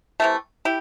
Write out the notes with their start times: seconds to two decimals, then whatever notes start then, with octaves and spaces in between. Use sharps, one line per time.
0.20 C3 E3 A3
0.65 E4 G4